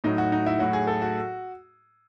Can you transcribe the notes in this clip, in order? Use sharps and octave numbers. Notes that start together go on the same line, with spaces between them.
A2 F#3 D#4
F#4
D#4
E4
A2 F#3 F#4
G#4
A4
F#4